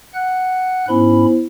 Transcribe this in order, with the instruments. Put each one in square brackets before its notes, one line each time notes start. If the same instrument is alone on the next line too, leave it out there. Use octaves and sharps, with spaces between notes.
[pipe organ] F#5 F#6
[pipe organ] G#2 C#4 B5 [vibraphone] B3 E4 C5